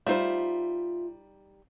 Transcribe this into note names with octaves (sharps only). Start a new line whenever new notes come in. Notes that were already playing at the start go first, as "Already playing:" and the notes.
G3 D#4 F4 C5 E5